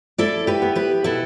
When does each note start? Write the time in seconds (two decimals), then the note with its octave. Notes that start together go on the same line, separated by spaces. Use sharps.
0.18 E4 A4 D5
0.47 G4 B4
0.62 B3
0.75 G4 B4
1.04 B2 E4 A4